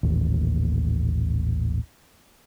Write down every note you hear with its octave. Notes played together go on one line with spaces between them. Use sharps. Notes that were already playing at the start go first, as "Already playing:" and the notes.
D#1 A1 D#2